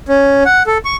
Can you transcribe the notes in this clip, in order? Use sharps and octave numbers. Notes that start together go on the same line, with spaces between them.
C#4
F#5
A4
C#6